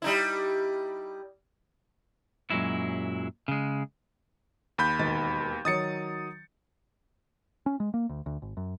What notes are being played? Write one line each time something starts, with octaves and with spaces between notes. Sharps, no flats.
G3 D#4 E4
F#2 A#2 F#3 G#3 E4
C#3 G#3
D#2 B5 G6
E1 D#3 A6
D#3 F#3 C#5 D#6 A6 C#7
C#4
G#3
A#3
D2
D2
G#1
F#2